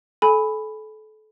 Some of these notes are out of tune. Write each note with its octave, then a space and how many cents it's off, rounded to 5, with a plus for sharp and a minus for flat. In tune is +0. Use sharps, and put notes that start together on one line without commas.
A4 -30 G#5 +0 B5 +0